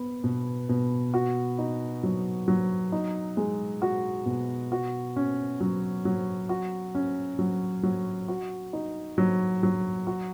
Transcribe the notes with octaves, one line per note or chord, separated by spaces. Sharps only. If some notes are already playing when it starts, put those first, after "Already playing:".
Already playing: B3
B2
B2
F#4
D#4
F#3
F#3
D#4
G#3
F#4
B2
F#4
C#4
F#3
F#3
F#4
C#4
F#3
F#3
F#4
D#4
F#3
F#3
F#4